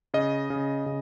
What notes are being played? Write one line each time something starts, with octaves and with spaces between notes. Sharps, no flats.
C#3 D#5
C#3
C#3